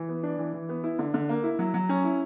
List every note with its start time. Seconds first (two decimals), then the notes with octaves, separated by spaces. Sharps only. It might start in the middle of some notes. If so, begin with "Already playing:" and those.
Already playing: E3
0.08 B3
0.23 D4
0.39 E3
0.54 E3
0.69 B3
0.84 E4
0.99 D3
1.14 D3
1.29 A#3
1.44 E4
1.59 F#3
1.74 F#3
1.89 C#4
2.04 E4